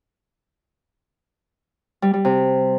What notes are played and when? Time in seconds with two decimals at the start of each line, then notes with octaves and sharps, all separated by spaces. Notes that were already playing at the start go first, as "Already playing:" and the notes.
2.02 G3
2.14 G3
2.25 C3